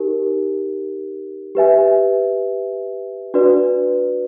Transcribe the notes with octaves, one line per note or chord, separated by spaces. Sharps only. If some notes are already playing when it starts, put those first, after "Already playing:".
Already playing: D#4 G4 A#4
G4 B4 E5 G#5
D4 F#4 B4 D5